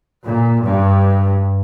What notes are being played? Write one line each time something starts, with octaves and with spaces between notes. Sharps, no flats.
A#2
G2